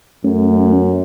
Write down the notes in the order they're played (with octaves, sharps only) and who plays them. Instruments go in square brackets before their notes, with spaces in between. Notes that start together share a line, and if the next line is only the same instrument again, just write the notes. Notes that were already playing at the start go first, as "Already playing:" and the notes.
[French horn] F#2 [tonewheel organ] A3 C#4